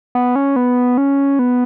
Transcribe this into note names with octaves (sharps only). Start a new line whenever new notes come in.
B3
C#4
B3
C#4
B3